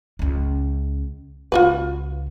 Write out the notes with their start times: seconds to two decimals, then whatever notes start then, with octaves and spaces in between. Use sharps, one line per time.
0.19 C#2 C#4
1.52 C#2 C#3 F4 F#4 B4